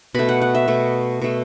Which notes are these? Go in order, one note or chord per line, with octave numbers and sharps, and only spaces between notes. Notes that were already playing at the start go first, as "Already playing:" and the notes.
B2 A3 B5
F#5
F#5
E5
B2 A3
B2 A3